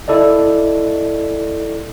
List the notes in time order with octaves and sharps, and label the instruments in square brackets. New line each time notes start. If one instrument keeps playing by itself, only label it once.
[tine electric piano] E4 A4 D5 D#5